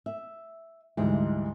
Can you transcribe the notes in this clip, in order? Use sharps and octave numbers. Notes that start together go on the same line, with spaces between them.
E5
D2 G#2 E3 G3 G#3